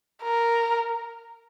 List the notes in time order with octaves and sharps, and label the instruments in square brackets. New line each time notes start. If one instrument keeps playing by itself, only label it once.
[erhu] A#4